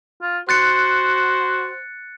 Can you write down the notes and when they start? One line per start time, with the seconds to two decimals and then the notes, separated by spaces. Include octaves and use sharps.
0.22 F4
0.49 F#4 C5 F#6 A6 C#7